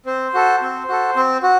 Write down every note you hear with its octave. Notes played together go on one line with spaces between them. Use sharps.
C4 C5
F#4 A4
C4
F#4 A4
C4
F#4